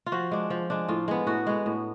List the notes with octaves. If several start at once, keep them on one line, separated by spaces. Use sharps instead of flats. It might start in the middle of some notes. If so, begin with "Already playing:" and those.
F4
F3 F#4
G#3 D4
F3
G#3 D4
A2 F4
G#3 B3
A2 F#4
G#3 B3
A2